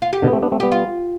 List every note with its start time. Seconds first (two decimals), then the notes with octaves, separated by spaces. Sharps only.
0.02 F4
0.13 G4
0.22 B2 D3
0.27 B3
0.33 A3 C4
0.43 B3 D4
0.52 A3 C4
0.60 G3 B3 G4
0.72 F4